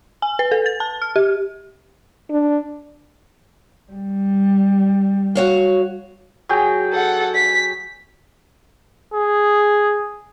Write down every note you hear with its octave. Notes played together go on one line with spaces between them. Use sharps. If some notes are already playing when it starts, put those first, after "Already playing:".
G#5
B4
A4
A6
A5
F6
G4
D4
G3
F#4 C#5 F5
F#3 G#4 G5
A4 F#5
B6
G#4